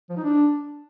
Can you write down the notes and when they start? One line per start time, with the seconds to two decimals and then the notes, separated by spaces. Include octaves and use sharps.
0.10 F3
0.17 D#4
0.24 D4